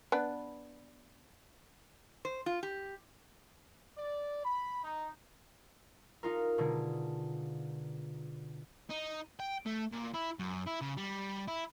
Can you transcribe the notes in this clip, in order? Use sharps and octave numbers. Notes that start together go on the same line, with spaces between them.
B3 D4 B4
C5
F4
G4
D5
B5
D#4
D#4 F4 A#4
B2 D3 G#3
D#4
G5
A3
A#2
E4
F#2
E4
C#3
G3
E4